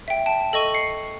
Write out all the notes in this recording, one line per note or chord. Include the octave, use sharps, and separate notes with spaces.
E5 G5
G5 A5
A4 D#5 C#6 D#7
C7 C#7